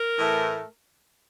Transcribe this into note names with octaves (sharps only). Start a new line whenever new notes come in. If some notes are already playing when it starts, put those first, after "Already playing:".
Already playing: A#4
A2 E3 A3